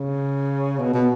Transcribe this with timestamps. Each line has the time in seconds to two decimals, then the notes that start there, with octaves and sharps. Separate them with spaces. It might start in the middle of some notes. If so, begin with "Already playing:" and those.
Already playing: C#3
0.79 B2
0.94 B2